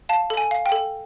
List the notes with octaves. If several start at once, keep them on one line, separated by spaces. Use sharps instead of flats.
F5 A5
A4
G#5
F5
G5
A4